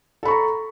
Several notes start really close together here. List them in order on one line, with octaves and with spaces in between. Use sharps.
A4 B5 C#6 A#5